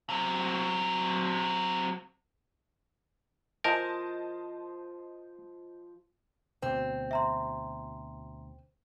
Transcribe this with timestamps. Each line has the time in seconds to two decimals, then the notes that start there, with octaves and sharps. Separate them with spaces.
0.10 F#3 C4
3.64 F3 A#4 C5 D#5 A5 G6
6.62 D2 B2 C4
7.11 E5 A#5 C6